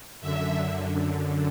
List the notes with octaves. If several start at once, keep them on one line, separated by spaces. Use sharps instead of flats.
F#2 D3 E5